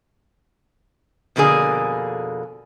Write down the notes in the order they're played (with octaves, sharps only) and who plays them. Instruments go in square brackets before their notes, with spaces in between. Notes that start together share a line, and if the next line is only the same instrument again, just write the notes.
[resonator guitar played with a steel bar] F2 B2 D3 A#3 G#4